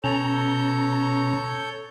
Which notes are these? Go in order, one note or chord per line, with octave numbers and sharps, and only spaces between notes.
B2 C#4 A4 C#5 A#5 G6